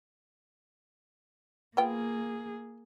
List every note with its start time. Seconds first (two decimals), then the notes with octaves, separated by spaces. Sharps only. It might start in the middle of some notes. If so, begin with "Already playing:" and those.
1.77 A#3 B3 F4 G#4 G5